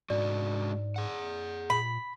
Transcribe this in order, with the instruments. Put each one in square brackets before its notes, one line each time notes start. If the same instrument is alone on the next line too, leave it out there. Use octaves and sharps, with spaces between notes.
[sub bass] G#2 [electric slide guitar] G#3 D4 F#4 [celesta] D5
[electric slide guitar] G#4 F#5
[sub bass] A#2 [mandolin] B5